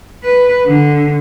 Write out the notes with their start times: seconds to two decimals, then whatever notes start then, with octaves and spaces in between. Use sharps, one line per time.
0.24 B4
0.67 D3